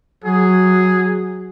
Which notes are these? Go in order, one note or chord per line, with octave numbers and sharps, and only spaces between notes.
F#3 G#4